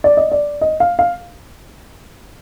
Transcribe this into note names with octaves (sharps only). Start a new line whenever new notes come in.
D5
D#5
D5
D#5
F5
F5